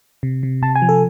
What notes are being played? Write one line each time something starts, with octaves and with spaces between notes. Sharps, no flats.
C3
C3
C3 A5
G#5
F3
A4